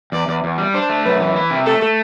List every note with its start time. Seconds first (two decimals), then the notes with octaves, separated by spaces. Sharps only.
0.12 E2 D5
0.28 E2
0.44 E2
0.58 G3
0.74 D4 C5
0.89 A3
1.04 F#2 B4
1.20 E3
1.36 E4
1.50 C3
1.66 A3 A4
1.82 A3